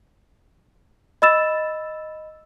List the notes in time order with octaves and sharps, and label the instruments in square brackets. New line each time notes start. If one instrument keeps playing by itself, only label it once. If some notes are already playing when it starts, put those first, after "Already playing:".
[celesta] D#5 B5 E6 A6 E7